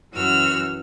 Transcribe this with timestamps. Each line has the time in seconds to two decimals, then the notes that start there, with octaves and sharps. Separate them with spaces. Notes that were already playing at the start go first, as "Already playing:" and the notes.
0.13 F#2 E3 F#4 E6 F6